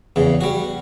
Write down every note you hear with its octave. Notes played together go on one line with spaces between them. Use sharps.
E2 C#3
G3 F#4